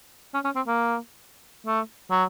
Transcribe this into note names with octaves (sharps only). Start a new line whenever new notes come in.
C#4
C#4
C4
A#3
A3
F#3